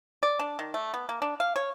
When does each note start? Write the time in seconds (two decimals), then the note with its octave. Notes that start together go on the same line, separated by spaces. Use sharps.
0.23 D5
0.39 D4
0.59 D#3
0.74 A3
0.94 B3
1.09 A#3
1.22 D4
1.40 F5
1.56 C#5